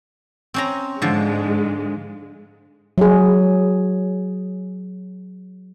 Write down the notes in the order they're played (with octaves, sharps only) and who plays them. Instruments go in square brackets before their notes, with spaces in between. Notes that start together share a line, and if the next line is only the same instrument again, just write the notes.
[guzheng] C4 C#4 A#5
[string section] G#2 G#3 [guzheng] D3 F3
[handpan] F#3 G#4